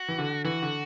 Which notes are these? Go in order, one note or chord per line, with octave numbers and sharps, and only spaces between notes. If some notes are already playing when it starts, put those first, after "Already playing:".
Already playing: F#4
E3
D3
E3 F#4
D3